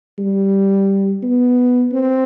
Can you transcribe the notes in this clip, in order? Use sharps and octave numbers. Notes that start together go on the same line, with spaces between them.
G3
B3
C4